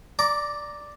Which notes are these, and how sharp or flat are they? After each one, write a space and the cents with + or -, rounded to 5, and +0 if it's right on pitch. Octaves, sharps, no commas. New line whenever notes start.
D5 +0 A#5 +0 D6 -25